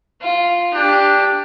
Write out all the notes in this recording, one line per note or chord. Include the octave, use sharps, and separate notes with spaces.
F4
D4 G4